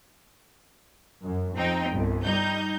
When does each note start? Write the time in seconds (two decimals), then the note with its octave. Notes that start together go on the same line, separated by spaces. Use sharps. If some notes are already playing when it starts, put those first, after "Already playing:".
1.23 F#2
1.56 F2 C4 D#4 G5
1.90 G1 C2
2.23 G3 D#4 G6